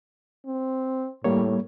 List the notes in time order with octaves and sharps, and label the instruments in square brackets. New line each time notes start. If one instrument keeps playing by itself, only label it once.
[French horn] C4
[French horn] A2 [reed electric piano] G3 A#3 C#5